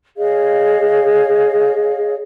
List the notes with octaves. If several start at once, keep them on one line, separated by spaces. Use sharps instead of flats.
G#4 C#5 D#5 F5